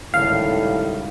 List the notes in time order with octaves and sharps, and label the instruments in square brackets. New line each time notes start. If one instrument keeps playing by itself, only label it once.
[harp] G#1 C#2 A4 [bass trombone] A2 [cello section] D#3 G3 [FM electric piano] F5